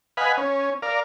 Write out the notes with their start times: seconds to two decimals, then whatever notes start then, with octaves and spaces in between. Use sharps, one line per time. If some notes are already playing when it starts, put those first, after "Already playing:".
0.17 B4 D#5 F5 F#5 G#5 B5
0.38 C#4
0.82 A#4 D5 F5